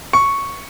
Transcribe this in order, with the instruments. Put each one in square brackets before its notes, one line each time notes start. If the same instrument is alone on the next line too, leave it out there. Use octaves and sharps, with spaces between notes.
[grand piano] C#6